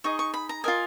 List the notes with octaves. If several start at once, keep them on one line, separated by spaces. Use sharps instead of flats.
D#4 G#4 D#5 C#6
C#6
B5
A#5
F4 A#4 D#5 G#5